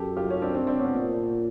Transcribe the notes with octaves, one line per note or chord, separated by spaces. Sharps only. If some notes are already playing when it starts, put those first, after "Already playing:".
Already playing: F#2 G4 A4
F4 G4
C#4
C4 D4
C4 D4
C4 D4
B3 C#4
A#2